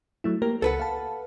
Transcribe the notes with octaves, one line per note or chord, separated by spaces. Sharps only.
F#3 A3 E4
A#3 G4 A#4
C#2 A4 B4 F#5
F5 A5